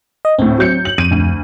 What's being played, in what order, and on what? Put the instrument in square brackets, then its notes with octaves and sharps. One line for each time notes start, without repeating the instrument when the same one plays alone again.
[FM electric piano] D#5
[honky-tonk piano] D2 A2 [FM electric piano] C4
[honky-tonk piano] F#3 G6 C#7
F#7
[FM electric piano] F2 [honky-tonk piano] D#7
[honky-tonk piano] D2